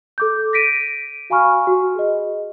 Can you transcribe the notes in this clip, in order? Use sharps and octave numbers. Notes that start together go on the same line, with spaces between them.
A4 D6 G6
A#6 B6 D7 D#7
F#4 F5 G#5 B5 C#6 F6
F#4
G#4 D#5